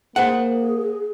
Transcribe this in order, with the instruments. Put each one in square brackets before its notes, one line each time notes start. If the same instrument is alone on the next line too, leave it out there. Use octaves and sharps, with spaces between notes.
[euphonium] A#3 [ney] G#4 [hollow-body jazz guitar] C5 F#5